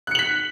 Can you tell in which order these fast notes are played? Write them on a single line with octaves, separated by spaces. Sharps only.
F#6 C#7 F#7 B6